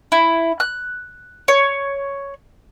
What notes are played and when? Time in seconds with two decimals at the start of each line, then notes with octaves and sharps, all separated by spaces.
0.12 E4
0.60 F#6
1.48 C#5